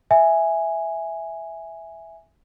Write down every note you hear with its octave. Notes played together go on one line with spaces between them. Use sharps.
E5 G#5